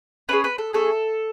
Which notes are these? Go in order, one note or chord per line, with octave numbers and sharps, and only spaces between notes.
C#4 E4 G#4 B4
B4
A4
A3 C#4 G#4 A4